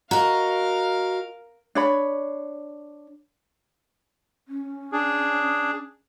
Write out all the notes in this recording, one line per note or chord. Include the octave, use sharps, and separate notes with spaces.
F#4 A#4 D#5 F5 A#5
D4 C#5 B5
C#4
D4 G#4